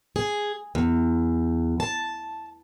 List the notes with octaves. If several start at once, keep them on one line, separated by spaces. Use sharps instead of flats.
G#4
E2
A5